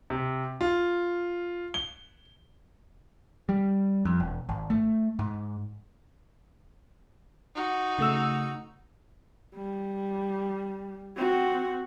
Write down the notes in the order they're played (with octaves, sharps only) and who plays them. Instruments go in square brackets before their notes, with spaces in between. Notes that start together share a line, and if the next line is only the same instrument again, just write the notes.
[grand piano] C3
F4
G7
[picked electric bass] G3
F2
E1
G#1
A3
G#2
[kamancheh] D#4 F#4
[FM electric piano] C#3 A3 E6
[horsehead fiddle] G3
C4 F#4